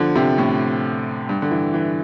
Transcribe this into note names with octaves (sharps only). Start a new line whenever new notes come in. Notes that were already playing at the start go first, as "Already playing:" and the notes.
Already playing: D3 F3
C3
A2
G2
D3
E3
E3